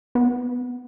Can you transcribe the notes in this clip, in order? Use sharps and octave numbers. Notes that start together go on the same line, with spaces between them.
B3